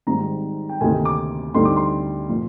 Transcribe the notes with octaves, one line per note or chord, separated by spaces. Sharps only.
G#1 G#2 G3 C4 A#5
G5
D2 C3 D#3 A#3 D#4 G#5
D6
D2 D3 G3 C4 D#4 C6
D6
C6
A#2 F3